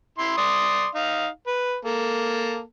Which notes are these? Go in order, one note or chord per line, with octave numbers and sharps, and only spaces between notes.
E4 C6
D5 C6 D#6
D#4 F5
B4
A#3 A4